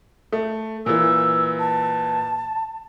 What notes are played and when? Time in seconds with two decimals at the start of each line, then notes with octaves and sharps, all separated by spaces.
0.32 A3
0.86 A#2 E3 E6
1.59 A5